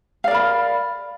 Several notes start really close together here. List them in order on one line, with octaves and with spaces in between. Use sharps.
F5 D5 A#4 B5